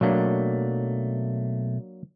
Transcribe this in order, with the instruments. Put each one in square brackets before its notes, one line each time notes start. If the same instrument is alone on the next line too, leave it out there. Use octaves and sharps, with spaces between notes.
[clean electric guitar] B1 A3 [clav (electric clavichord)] F#3 A#3 D4